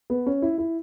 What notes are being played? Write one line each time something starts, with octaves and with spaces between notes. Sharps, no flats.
B3
C#4
E4
E4